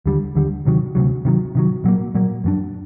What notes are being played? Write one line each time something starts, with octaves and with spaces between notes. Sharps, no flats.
D#2 D3 G3
D#2 D3 G3
D2 C3 D#3 F#3
D2 C3 D#3 F#3
C3 D#3 F#3
C3 D#3 F#3
A#2 F#3 A#3
A#2 F#3 A#3
F#2 F#3 A3 D4